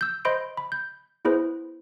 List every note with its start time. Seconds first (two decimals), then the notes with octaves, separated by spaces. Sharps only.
0.01 E6 G6
0.25 C5 D#5 B5 C6 G6 D7
0.57 B5
0.72 G6
1.25 B3 E4 G#4 B4 C5